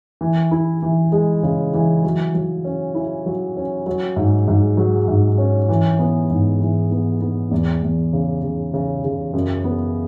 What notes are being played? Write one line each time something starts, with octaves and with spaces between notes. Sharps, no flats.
E3
E4
E3
G#3
C#3
E3
F#3
F#3
C#4
E4
F#3
C#4
F#3
G#2
G#2
F#3
G#2
C#4
E3
B3
G#2
E3
B3
B3
E2
E2
C#3
C#3
C#3
C#3
F#2
B3